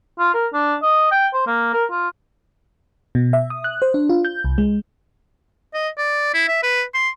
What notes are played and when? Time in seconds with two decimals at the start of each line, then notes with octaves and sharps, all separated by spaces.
0.19 F4
0.34 A#4
0.53 D4
0.82 D#5
1.11 G5
1.33 C5
1.47 A#3
1.73 A#4
1.90 F4
3.15 B2
3.33 E5
3.50 D#6
3.64 F#6
3.82 C5
3.94 D4
4.09 F4
4.25 G6
4.44 C2
4.58 G#3
5.74 D#5
5.98 D5
6.34 E4
6.48 E5
6.63 B4
6.94 C6